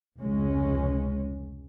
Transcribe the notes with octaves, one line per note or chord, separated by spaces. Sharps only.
F1 C#2 G#3 C#4